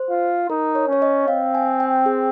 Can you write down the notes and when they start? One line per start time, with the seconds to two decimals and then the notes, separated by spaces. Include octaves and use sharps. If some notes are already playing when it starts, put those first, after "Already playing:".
Already playing: C5
0.10 F4
0.50 D#4 A#4
0.75 C#5
0.88 C#4 C#5
1.02 D#5
1.28 C4 F5
1.55 G#5
1.80 G5
2.06 G#4